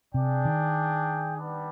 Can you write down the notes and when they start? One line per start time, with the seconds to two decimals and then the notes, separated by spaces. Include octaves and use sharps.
0.14 C3 D4 G#4 D5 G5
0.45 D#3
1.36 G3 B3 D4